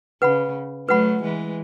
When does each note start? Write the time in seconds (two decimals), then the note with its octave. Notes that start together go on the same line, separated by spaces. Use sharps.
0.22 C#3 B4 F#5 B5
0.88 F#3 A3 B4 F#5 B5
1.22 E3 G#3